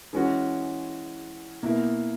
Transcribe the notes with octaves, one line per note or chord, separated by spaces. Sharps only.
E3 G#3 C#4 F#4
B2 A#3 E4